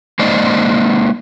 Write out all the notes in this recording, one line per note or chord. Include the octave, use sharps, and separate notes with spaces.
G#3 A#3 D#4 C5 D5 D#5